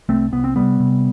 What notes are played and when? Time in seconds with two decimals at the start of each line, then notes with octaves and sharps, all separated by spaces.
0.09 C2 A3 C4
0.32 C2 B3
0.44 C4
0.56 C3 G3 B3
0.80 C3